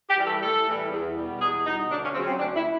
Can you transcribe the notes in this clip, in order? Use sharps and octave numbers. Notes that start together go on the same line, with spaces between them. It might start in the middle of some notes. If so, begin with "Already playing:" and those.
G4
E3 G3
A4
A2 A4
E3 G3
E2
B2 G3
E2 G#4
B2 G3 D#4
D2 D4
C#4
C#3 F#3 C4 C#4
C4
D2 D4
E4